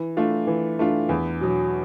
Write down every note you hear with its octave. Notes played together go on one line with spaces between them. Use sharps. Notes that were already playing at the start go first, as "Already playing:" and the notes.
Already playing: E3
A3 D4 F4
E3
A3 D4 F4
E2
B2 F#3